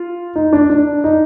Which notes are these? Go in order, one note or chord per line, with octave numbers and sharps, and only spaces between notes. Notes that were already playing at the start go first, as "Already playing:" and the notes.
Already playing: F4
D#4
D4
D4
D#4